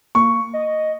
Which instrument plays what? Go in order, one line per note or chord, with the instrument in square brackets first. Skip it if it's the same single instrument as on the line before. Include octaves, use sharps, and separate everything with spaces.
[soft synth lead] A#3 [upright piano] C#6
[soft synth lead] D#5